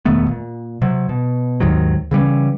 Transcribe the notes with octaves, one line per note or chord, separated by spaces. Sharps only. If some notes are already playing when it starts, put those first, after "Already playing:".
E1 D#3 A3 B3
A#2
C3 F#3
B2
D#2 G#2 D#3 F#3
C#3 E3 G3 C#4